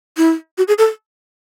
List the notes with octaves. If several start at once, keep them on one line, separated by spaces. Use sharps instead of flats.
E4
F#4
G#4
A4